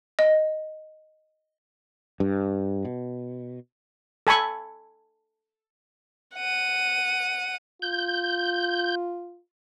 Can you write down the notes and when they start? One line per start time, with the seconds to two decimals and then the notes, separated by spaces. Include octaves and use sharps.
0.19 D#5
2.20 G2
2.85 B2
4.27 A4 G#5 B5 C#6
6.36 F#5 D#7
7.82 F4 G6